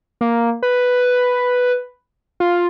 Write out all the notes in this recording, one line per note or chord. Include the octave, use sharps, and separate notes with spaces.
A#3
B4
F4